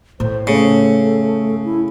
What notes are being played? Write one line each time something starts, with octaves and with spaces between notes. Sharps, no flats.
A2 C5
C#3 A3
E4